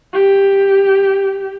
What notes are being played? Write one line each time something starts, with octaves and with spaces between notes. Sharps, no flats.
G4